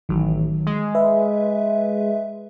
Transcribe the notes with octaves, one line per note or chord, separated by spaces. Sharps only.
A1 D#3 F#3
G#3
B4 E5